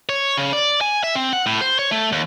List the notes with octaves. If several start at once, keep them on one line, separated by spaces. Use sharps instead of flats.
C#5
C#3
D5
G#5
E5
C4
F#5
A2
C5
C#5
A3
D#2